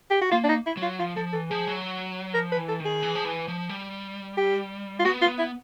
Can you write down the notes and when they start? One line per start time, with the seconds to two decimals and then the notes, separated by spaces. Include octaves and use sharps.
0.10 G4
0.22 F#4
0.31 A#3 F4
0.44 D4
0.49 D#4
0.66 E4
0.77 F#3 F4
0.99 F3 F4
1.16 F3 A4
1.33 E3 A4
1.50 F3 G#4
1.67 F#3
2.34 F3 A#4
2.52 B4
2.57 E3
2.69 A4
2.80 D#3
2.85 G#4
3.02 E3
3.15 F3
3.25 E3
3.48 F3
3.69 G3
4.37 G4
4.99 F4
5.05 B3 F#4
5.22 F4
5.27 B3
5.39 E4